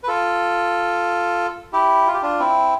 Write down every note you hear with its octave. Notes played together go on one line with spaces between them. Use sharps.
B4
F4 A4
E4 G4
F4
G4
D4 F4
C4 E4